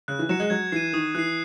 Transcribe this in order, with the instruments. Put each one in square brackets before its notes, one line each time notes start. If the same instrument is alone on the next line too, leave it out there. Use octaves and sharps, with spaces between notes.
[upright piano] C#3 [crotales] F#6
[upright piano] E3
[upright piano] F#3 [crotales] C#7 E7
[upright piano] G#3
[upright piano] F#3 [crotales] G#6
[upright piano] E3 [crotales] C7 D#7
[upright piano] D#3 [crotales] D#6
[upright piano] E3 [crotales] F#6 C7